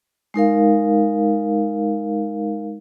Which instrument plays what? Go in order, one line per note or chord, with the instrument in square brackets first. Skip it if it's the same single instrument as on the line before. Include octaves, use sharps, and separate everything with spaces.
[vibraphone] G#3 D#4 A#4 F5